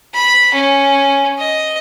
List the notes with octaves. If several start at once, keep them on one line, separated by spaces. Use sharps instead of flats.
B5
C#4
D#5